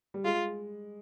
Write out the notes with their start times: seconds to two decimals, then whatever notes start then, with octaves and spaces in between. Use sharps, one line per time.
0.14 G3
0.24 G#3 F4